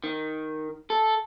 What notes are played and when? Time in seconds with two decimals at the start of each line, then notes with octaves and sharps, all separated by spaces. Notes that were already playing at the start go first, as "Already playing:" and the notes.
0.04 D#3
0.90 A4